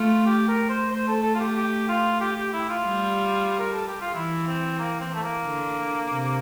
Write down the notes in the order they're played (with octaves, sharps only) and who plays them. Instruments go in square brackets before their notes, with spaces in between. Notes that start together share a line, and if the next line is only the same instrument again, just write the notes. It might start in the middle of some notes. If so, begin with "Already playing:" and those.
Already playing: [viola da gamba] A3 [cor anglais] F4
[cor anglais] G4
A#4
C5
[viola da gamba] A3 [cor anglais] C5
[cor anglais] A4
A4
F4
G4
G4
F4
G4
G4
E4
F4
[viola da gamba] G3
[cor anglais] A#4
A4
G4
F4
[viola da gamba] E3 [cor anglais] E4
[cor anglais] C4
A#3
C4
A3
A#3
[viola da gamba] D3
C3